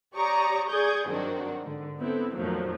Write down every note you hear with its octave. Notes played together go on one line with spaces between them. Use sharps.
G4 C#5 D5 A#5 C#6 D#6
G#4 D5 C#6 D#6 G6 G#6
G2 D#3 F#3 C4 D4 F#4
G#2 D3
B3 C4 E4 A4
F2 A#2 D#3 F3 F#3 A3